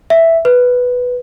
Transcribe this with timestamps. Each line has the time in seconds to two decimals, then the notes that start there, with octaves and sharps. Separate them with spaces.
0.10 E5
0.45 B4